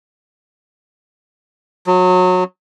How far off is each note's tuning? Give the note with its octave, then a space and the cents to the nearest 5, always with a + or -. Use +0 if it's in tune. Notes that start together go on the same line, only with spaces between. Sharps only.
F#3 -25